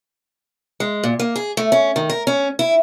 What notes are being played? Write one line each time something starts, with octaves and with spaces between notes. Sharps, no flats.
G#3
A#2
A#3
G#4
A3
C#4
D#3
A#4
C#4
E4